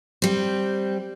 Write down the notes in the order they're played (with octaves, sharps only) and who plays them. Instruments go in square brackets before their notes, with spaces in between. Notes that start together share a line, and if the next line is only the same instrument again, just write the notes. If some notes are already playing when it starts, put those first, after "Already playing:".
[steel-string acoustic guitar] G3 C4